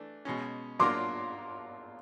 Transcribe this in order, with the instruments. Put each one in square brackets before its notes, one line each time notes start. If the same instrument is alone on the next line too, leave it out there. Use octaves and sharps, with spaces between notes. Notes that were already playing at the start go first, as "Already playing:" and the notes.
Already playing: [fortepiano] E3 A3 D4
B2 G#3 C#4
[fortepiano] F#3 A#3 D4 F4 A#4 [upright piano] C6 D6